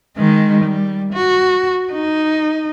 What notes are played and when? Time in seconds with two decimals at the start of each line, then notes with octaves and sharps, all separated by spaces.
0.17 D#3 G#3
0.64 G3
1.14 F#4
1.93 D#4